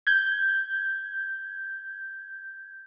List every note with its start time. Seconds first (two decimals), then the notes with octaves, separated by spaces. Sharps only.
0.07 G6 G#6